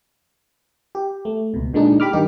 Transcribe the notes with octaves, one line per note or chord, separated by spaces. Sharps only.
G4
A3
C#2 B2
A#2 D3 G#3 D4 D#4
G4 B5 D6 F6
G2 D#3 D#4 G4